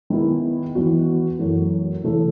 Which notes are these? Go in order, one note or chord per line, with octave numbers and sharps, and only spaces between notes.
D#3 G#3 B3 E4
E3 B3 F#4
F#2 E3 A3
C#3 E3 A3